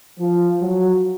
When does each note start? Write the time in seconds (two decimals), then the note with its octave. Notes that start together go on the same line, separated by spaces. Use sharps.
0.19 F3
0.61 F#3